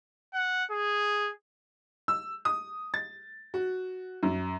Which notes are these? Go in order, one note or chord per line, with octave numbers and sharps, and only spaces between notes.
F#5
G#4
E6
D#6
A6
F#4
F#2